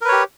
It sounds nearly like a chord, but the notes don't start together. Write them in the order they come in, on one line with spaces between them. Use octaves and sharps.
A#4 B4 C#5 G4